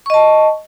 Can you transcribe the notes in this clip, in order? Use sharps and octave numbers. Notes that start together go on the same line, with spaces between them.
D#5 A5 C#6